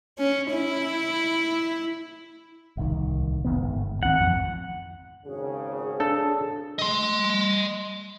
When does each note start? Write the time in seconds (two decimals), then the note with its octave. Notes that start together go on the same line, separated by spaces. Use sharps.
0.18 C#4
0.52 E4
2.77 D1 C2 D#3
3.45 F1 D#3 B3
3.58 G1 G#2
4.03 C#2 D#3 C4 F#5
4.18 A1 F2 F3
5.26 G#1 C#3 G#4
6.00 D4 A4 A5
6.79 D#5 C6